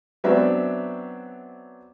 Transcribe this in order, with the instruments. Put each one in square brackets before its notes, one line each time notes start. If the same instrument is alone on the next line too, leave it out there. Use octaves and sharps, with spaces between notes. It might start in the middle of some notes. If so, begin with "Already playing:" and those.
[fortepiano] F#3 B3 C4 D4 B4 E5